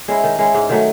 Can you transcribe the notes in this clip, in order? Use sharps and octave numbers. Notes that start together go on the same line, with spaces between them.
G#3 C#4 E4
D#3
G#3 C#4 E4
G#2
D#3 F#3 A3